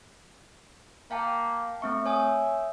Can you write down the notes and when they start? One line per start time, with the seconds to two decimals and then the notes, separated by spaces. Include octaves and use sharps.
1.11 A#3 F5 G5 A5
1.82 A3 C4 E5 C#6
2.06 C#5 G#5 D#6